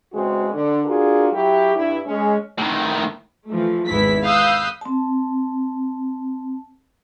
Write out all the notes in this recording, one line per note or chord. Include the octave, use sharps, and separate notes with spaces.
E2 C#3 G#3 C4 F#4
D3
D4 F4 F#4 G#4 A#4
F#3 E4 G4
G2 E4
G#3 C#4
A2 D#3
E3 F3 A3
G#1 E2 B3 E4 B6
F5 B5 D#6 E6 F#6 G6
C4 A5